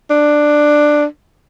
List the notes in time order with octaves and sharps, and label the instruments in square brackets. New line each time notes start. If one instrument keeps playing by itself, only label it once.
[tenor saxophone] D4